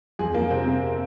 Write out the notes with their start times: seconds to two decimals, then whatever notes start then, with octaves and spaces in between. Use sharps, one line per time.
0.19 F2 G#4
0.34 F3 A#3
0.51 C3 C4
0.67 C3